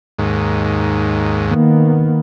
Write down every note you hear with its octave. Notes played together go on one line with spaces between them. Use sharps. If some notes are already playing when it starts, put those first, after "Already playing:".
D#2 G#2
D#3 A#3 B3